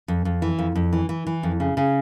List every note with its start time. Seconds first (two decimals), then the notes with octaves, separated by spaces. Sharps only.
0.08 F2
0.25 F2
0.42 E3
0.59 F2
0.75 F2
0.93 E3
1.09 E3
1.27 E3
1.43 F2
1.60 C#3
1.77 C#3